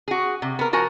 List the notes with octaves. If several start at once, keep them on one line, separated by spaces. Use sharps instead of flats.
F#4 G#4
C3
B3 A#4
F3 F#4 A#4 G#5